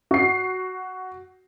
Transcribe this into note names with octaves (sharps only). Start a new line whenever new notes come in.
F#4 C7